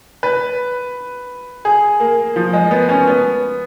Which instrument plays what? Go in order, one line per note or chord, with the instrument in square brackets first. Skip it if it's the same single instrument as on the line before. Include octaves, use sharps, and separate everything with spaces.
[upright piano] B4
G#4
A#3
F3
G#3
B3
C#4
B3